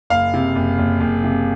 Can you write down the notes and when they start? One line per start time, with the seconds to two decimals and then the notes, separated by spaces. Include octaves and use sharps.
0.10 F#1 F5
0.34 C3
0.55 F#1
0.78 F#1
1.00 F#1
1.24 C3